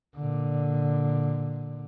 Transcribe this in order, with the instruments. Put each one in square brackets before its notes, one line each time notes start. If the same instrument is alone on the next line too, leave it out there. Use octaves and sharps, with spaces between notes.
[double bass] A#2 D3